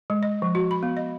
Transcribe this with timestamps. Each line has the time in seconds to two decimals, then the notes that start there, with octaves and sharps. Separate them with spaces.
0.10 G#3
0.23 D#5
0.42 F3
0.55 F#4
0.71 B5
0.83 B3
0.97 D#5